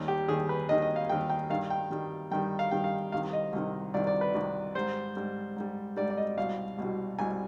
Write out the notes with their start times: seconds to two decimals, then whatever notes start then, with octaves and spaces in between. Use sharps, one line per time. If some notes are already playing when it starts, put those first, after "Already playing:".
Already playing: D#2 D#3 G3
0.08 G4
0.28 D#2 D#3 G3 G#4
0.49 B4
0.69 D#2 D#3 G3 D#5
0.82 D#5
0.96 F5
1.09 D#2 D#3 G3 G5
1.30 G5
1.50 G2 D#3 G3 F5
1.70 G5
1.91 G2 D#3 G3
2.31 G2 D#3 G3 G5
2.59 F5
2.71 G2 D#3 G3 G5
2.84 F5
3.12 C2 C3 D#3 F5
3.33 D#5
3.53 C2 C3 D#3
3.94 C2 C3 D#3 D5
4.07 D5
4.21 B4
4.34 C2 C3 D#3
4.75 G#2 G3 C5
5.16 G#2 G3
5.56 G#2 G3
5.97 G#2 G3 D5
6.10 D5
6.17 D#5
6.37 C2 B2 G3 F5
6.78 C2 B2 G3
7.19 C2 B2 G3 G#5